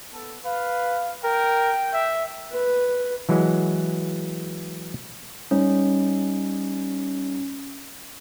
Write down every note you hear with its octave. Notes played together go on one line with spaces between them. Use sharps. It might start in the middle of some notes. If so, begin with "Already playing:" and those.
B3 A4
B4 F5
A#4 G5
E5
B4
E3 F#3 G#3
G3 C#4 D#4 C#5